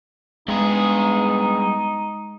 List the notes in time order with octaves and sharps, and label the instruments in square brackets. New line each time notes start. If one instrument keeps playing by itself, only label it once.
[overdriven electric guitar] G2 G#4 [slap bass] G#3 [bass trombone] B3 [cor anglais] D#4